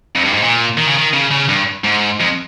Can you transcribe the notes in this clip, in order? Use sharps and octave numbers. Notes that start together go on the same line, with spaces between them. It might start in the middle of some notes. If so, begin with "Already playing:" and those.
F2
G2
G#2
A#2
D#3
C#3
D#3
C#3
C#3
G2
G#2
F2